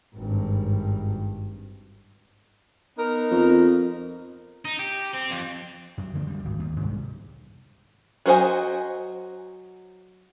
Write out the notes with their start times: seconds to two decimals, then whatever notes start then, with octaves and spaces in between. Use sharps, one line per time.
0.15 G#1 G2
2.97 B3 D#4 A#4
3.31 F2
4.65 D#4
4.79 G4
5.14 C4
5.30 F2
5.98 F#2
6.14 D3 F3 A3
6.27 D2 G3
6.45 G#1
6.59 D#2
6.79 C2 G#2 G3
8.26 F#3 F#4 C5 D#5 G#5